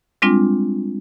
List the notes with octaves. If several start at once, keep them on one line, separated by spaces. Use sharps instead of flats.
G3 G#3 C4 D4 F4